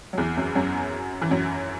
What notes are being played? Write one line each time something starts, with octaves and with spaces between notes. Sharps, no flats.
F#3
E2 E3
F#2 F#3
F#2 F#3
E3
F#2 F#3